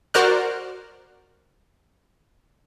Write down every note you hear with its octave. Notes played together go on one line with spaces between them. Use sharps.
F#4 A#4 C5 D5 F6 F#6